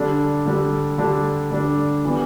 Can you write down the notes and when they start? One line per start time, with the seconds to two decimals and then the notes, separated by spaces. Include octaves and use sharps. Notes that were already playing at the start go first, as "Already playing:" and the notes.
Already playing: D3 G3 D4 A4
0.46 D3 G3 D4 A4
0.98 D3 G3 D4 A4
1.51 D3 G3 D4 A4
2.05 E3 G3 B3